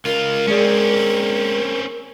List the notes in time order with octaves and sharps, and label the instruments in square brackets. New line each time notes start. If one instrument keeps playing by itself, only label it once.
[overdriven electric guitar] C#2 F4 [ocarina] A#4
[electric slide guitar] G#3 G#4 D5 [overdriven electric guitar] C4 C#4